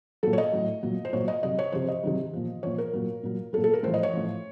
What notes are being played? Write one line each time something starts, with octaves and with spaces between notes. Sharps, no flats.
A#2 F#3 A4
C#5
D#5
A2 F#3
A#2 F#3
C5
A#2 F#3 C#5
D#5
C3 F#3 D#5
C#5
C3 F3 C5
D#5
C3 D#3 F#3
A#2 F3
A#2 F3 C#5
A#4
A#2 F#3
A#2 F#3
A#2 F#3 A4
A4
A#4
A2 F3 C5
D#5
C#5
A2 F3